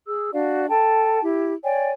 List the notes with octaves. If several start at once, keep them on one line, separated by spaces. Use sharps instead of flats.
G#4 E6
D4 F#4 D5 F5
A4 G5 A5
E4 G4
C#5 D5 G5 G#5